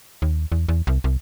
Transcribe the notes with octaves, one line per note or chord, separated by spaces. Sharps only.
D#2
E2
E2
C2
C2